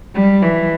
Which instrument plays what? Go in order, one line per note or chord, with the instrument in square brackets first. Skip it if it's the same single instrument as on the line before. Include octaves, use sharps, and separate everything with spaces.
[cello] G3
E3